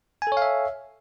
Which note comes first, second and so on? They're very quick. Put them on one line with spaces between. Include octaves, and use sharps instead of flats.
G#5 A4 C#5 F5 E5